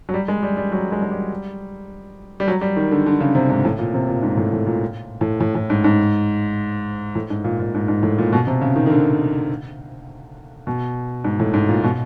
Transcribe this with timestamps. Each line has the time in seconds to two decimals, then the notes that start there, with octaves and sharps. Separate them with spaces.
0.09 F#3
0.14 G3
0.28 G#3
0.43 G3
0.57 G3
0.72 F#3
0.92 G#3
1.02 G#3
1.11 G3
2.40 G3
2.48 F#3
2.61 G3
2.76 D#3
2.91 D3
3.06 D3
3.20 C#3
3.35 C3
3.49 G#2
3.65 A2
3.79 A#2
3.94 C3
4.08 A#2
4.23 G#2
4.37 A2
4.53 A2
4.67 A#2
5.21 A2
5.40 A2
5.55 A2
5.70 G#2
5.84 G#2
7.15 A2
7.30 G#2
7.44 A#2
7.60 A#2
7.74 G#2
7.88 G#2
8.03 A2
8.18 A#2
8.33 B2
8.47 C3
8.61 C#3
8.76 D#3
8.86 D#3
8.90 D3
10.67 B2
11.24 G#2
11.40 A2
11.54 G#2
11.69 A#2
11.83 B2